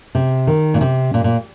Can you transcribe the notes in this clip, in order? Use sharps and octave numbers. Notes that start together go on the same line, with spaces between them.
C3
D#3
A#2
C3
A#2
A#2